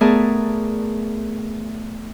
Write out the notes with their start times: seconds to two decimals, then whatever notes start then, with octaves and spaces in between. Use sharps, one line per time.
0.01 A3 B3 G#4 A#4 D5 A5